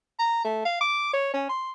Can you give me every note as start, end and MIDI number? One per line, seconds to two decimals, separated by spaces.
0.19 0.42 82
0.45 0.61 57
0.65 0.80 77
0.81 1.10 86
1.13 1.31 73
1.34 1.49 61
1.49 1.72 84